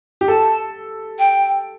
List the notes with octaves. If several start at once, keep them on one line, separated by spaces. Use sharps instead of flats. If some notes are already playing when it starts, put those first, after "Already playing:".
G4
A4 A5
G5